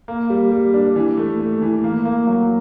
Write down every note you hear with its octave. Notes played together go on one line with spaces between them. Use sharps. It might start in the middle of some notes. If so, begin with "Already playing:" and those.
A#3
G3
G3
D4
E3
A3
A3
E3
A#3
A#3
F#3